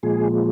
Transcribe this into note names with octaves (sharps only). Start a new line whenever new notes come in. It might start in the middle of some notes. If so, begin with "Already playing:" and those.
A#2 F3 G#3 G#4